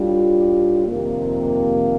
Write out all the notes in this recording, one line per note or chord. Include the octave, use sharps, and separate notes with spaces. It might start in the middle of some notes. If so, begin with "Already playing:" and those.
Already playing: A2 G3 D4 F4
F2 C3 D#3 A#3